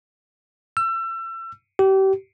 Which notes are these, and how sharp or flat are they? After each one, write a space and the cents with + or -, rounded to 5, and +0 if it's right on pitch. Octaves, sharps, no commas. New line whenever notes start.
E6 +35
G4 -30